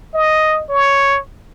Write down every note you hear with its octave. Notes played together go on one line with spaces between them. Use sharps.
D#5
C#5